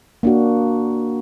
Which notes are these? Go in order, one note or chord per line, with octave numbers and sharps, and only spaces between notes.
A#3 D4 F#4